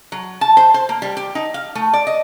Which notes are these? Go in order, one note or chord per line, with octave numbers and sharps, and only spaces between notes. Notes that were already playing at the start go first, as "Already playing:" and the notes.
F#3
A5
C5
C5
A#3
G3
G4
D#4
F5
A3
D5
D#5